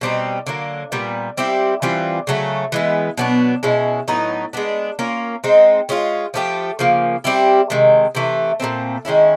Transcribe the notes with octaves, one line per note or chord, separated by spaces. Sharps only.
B2 G3 C4 D#4
D3 F#3 A#3
A#2 G3 B3
G3 C4 E4 G4
E3 G3 C4 F4
C#3 F#3 A3
E3 G#3 B3
B2 F#3 B3 D4
B2 G#3 C#4 E4
A2 F#3 B3 D#4
G#3 B3 D4
A#3 C#4 F4 A#4
G#3 C4 D#4
G#3 C#4 F4
F3 A3 D4 G4
C#3 F3 A#3
G3 C4 E4 G4
C3 D#3 G#3
C3 E3 A3
A#2 F3 A3 C4
D#3 G#3 C#4 E4